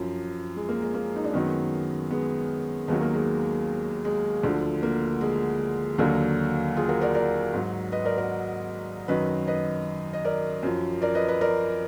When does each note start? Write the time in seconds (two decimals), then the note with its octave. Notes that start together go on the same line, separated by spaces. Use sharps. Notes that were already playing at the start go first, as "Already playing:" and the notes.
Already playing: F#2 F3
0.56 G#3
0.69 A#3
0.82 G#3
0.94 A#3
1.16 D#4
1.24 D4
1.33 F#2 D#3 F#3 G#3 B3
2.11 G#3 B3
2.88 D#2 D#3 F#3 G#3 B3
3.01 A#3
3.14 G#3
4.05 G#3
4.43 D2 D3 F3
4.83 A#3
5.21 G#3
5.98 D#2 D3 F#3 A#3
6.77 F4 G#4
6.89 F#4 A#4
7.01 A#4 D5
7.14 A#4 D5
7.53 G#2 F#3
7.92 B4 D#5
8.05 A#4 D5
8.18 F#4 A#4
9.08 F#2 D#3 F#3 B4 D#5
9.47 B4 D#5
10.13 D#5
10.25 A#4 D5
10.63 F#2 F3
11.02 A#4 D5
11.15 B4 D#5
11.28 B4 D#5
11.41 A#4 D5